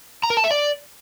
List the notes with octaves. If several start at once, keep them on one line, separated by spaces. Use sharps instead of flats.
A#5
A#4
A5
E5
D5